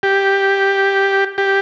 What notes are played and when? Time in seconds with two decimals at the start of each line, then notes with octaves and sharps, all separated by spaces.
0.03 G4
1.38 G4